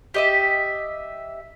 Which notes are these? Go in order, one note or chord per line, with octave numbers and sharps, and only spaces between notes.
G4 D#5 E5